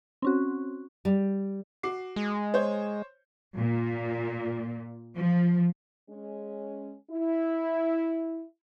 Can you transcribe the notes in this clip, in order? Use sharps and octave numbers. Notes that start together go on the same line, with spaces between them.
C4 C#4 F#4
G3
F#4 D6 C7
G#3
C5 C#5 G6
A#2
F3
G#3 C#4
E4